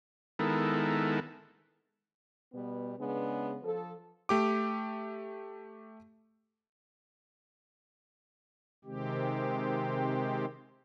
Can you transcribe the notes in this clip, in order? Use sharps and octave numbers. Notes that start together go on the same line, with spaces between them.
D#3 G#3 B3 E4 A4 A#4
B2 G3 B3
C#3 G#3 B3 D4
F3 A4
A3 G4 D6
C3 D#3 G#3 C4 G4